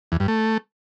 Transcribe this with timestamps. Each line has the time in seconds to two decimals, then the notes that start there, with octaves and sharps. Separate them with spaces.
0.12 E2
0.20 G2
0.28 A3